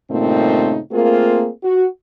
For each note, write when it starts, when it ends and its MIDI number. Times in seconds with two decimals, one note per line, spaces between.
0.10 0.78 43
0.10 0.78 46
0.10 0.78 49
0.10 0.78 57
0.10 0.78 60
0.10 0.78 63
0.92 1.48 57
0.92 1.48 58
0.92 1.48 60
0.92 1.48 65
0.92 1.48 68
0.92 1.48 70
1.63 1.86 66